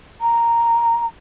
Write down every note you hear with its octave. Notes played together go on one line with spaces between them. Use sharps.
A#5